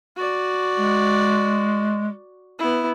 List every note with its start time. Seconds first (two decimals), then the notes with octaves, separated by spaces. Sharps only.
0.16 F#4 D5
0.77 G#3
2.59 B3 E4